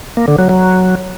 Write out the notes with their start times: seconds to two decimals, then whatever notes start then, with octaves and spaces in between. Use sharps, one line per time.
0.17 A#3
0.28 D3
0.39 F#3
0.49 F#3